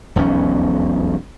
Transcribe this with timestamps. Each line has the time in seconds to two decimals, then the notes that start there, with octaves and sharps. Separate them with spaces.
0.16 E1 B1 F2 C#4